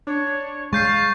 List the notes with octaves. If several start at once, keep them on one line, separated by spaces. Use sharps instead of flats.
D4 C#5
G#3 F5 C#6 G6 A6 C7